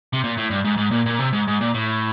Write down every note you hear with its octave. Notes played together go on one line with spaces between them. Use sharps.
C3
A#2
A2
G2
G#2
G#2
A#2
A#2
C3
G#2
G#2
A#2
A2